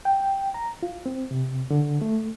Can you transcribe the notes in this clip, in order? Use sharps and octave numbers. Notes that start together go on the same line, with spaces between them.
G5
A#5
F4
C4
C3
D3
A3